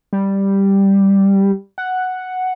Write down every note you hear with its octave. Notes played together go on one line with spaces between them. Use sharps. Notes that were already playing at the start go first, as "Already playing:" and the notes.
G3
F#5